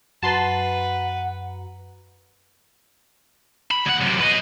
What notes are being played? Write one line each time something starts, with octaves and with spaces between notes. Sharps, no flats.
F#2 F#4 B4 F#5 A5 A#5 C6
B5
D2 F#5
F#2 C3
B4 D#5